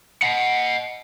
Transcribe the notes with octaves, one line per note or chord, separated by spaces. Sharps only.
D#5 F#5